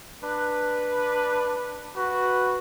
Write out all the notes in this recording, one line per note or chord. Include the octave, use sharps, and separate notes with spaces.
D4 B4
F#4 B4